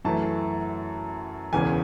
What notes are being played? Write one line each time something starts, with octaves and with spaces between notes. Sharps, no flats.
F#2 E3 A3 A5
E1 E2 C#3 G#5